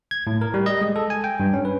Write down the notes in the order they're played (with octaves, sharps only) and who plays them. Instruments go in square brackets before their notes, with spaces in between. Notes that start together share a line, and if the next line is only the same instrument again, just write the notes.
[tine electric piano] G#6
A2
A#4
G3
D#5
G#3
A4
G#5
G5
G2
C#4
B4